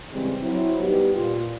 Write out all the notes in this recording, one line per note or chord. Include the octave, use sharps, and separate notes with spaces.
C#3 E3 G3 G#3 C4
F#3 C4 E4
G3 B3 D#4 G4
A#2 F4